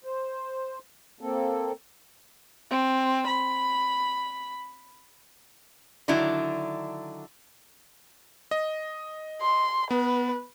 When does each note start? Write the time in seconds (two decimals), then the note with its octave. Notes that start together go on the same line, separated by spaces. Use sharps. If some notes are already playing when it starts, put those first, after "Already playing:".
0.04 C5
1.21 A#3 C4 A4
2.71 C4
3.27 B5
6.08 D3 D#3 F#3 D4 E4
8.51 D#5
9.42 C6
9.91 B3 B4